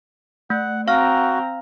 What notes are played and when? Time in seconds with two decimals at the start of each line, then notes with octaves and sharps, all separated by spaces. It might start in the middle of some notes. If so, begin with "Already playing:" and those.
0.50 A3 F#5
0.88 C4 F#4 F5 A#5 F6